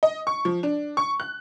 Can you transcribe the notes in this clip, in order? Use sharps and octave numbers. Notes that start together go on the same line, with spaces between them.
D#5
C#6
F3
D4
C#6
F#6